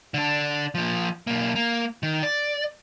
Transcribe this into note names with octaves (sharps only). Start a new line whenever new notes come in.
D3 D4
F3 A#3
B1 A#3
A#3
D#3
D5